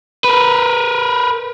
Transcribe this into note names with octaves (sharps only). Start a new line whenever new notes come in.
A#4 B4